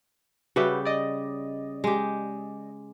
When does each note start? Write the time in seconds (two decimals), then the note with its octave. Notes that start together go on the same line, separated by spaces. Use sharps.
0.56 C#3 G3 F#4 G4 B4 E5
0.85 D5 D#5
1.84 G#3 G4